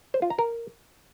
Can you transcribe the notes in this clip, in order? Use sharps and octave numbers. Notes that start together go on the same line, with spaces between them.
C5
F4
A#5
A#4